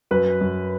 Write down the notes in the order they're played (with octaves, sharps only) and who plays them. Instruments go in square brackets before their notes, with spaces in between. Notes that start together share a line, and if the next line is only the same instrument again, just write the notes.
[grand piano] F#2 [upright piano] B4
[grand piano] F#2